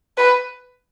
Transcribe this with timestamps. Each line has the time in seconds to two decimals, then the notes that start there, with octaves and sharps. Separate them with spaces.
0.17 B4